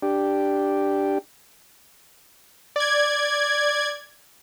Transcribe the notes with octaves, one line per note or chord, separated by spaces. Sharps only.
D4 G4
D5 G#6